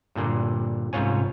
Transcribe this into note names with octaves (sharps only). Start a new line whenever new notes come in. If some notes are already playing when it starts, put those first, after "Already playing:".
G2 A#2 D3
C2 G#2 C#4 F4 C#5 G#5